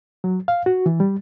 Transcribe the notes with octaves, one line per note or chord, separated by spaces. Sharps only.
F#3
F5
F#4
E3
G3